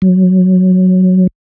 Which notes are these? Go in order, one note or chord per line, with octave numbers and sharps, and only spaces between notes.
F#3